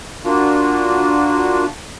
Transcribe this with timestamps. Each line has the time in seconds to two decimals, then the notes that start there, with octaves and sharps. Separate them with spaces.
0.24 A#3 D4 F4 F#4